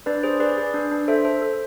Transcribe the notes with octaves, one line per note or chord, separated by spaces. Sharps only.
D4 B4 D5
G#4 C5
G#4 B4 D5
G#4
D4
D4
A4 C5 E5
A4 C5
A4